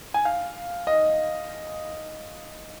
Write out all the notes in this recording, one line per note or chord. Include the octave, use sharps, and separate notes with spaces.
G#5
F5
D#5